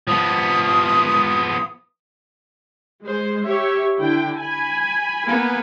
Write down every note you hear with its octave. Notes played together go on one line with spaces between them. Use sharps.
F3 B3 D#6
G#3 C5
G4 C#5 E5
D3 E4 G5
G#5 B5
A#3 B3